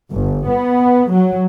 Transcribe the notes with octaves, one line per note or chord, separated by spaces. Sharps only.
G1
B3
F#3